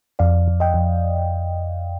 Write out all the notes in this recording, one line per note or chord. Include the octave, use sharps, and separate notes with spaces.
F2 D5 F5
F2
D#5 G5
F2